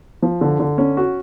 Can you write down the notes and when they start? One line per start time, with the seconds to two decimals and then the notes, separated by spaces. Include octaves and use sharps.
0.22 F3
0.41 D3
0.59 D3
0.78 C#4
0.97 F#4